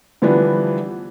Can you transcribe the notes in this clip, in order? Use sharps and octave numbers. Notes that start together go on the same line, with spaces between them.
D3 E3 F3 G3 B3 D4